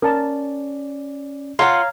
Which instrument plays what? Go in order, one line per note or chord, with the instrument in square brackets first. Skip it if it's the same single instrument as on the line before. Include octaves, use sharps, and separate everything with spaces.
[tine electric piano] C#4 D5 [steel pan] A#4 A5
[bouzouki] F4 F#5 [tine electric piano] C#5 G#6 [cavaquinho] F5 A#5